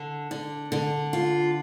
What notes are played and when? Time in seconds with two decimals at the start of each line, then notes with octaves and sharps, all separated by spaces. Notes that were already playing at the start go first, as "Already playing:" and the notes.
Already playing: D3
0.31 D3
0.72 D3
1.13 F4